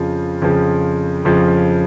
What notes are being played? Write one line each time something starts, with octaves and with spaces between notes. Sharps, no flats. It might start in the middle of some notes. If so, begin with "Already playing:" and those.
Already playing: F2 C#3 F3
F2 C#3 F3
F2 C#3 F3